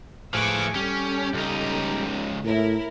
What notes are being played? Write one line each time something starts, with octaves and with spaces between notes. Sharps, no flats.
A2 F3 G#4 B4 C#6 D6 E6
G3 C#4 A4
C#2 D#4
A2 E4 A#4